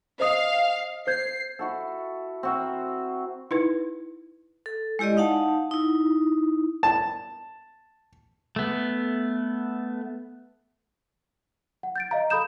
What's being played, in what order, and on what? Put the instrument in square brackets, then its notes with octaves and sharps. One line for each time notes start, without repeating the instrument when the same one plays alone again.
[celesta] C5 D#5 D#6 [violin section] F5
[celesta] C5 G6 G#6 [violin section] C7
[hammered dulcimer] E4 F#4 A4
C4 F#4 A#4
[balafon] D#4 E4 B4
[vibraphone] A4
G#3 E4 G4 D5 D#5
D#4 F5 F#5 A5
D#4 E4
[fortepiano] A5
[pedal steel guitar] A3 B3
[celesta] F#5
G6 A6 D7
D#5 F5 A#5
A4 B5 D#6 G6 E7